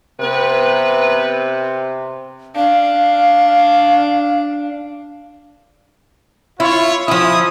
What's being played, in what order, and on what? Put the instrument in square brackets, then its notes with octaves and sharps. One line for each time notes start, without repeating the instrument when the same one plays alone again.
[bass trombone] C3 [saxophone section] B3 B4
[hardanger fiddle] D4 [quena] F5
[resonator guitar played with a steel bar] E4 [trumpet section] F4 C#5
[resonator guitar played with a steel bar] F3 E4 [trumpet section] E5 G#5 D#6